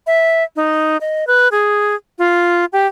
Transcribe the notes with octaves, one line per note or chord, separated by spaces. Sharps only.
E5
D#4
D#5
B4
G#4
F4
G4